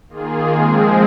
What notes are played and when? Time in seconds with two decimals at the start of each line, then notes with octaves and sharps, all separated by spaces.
0.09 D#3 A#3 F4 G#4
0.52 F3 G#3 C4 G#4